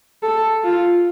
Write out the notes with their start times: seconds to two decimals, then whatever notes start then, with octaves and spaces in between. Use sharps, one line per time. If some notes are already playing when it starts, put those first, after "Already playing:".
0.23 A4
0.64 F4